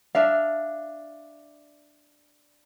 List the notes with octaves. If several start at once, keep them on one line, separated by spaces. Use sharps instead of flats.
D4 E5 F5